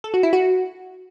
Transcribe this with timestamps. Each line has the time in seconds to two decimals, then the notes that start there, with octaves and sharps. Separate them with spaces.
0.04 A4
0.14 F#4
0.23 E4
0.33 F#4